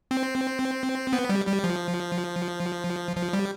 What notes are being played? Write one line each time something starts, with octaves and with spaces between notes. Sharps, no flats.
C4
B3
G3
G3
F3
F3
G3